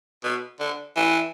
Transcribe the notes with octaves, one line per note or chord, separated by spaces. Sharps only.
B2
D3
E3